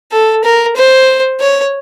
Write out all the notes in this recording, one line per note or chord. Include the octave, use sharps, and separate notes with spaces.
A4
A#4
C5
C#5